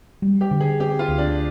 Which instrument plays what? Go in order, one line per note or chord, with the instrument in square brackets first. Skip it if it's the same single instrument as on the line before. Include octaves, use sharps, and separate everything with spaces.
[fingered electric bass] G3
[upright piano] G4
[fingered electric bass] D3
[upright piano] G#4
[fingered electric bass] C4 [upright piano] G4
[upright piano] F4
[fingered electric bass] D2
[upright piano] D4